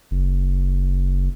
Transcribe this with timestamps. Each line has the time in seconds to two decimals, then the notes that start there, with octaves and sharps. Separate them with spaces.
0.11 F#1